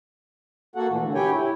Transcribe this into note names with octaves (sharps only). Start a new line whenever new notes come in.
A#3 F#4 A4 F#5
A#2 E3 A3
D3
E4 G4 C#5 G5 G#5
E4